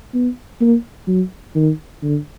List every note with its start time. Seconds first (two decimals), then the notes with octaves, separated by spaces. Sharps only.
0.14 B3
0.61 A#3
1.08 F#3
1.56 D#3
2.03 D3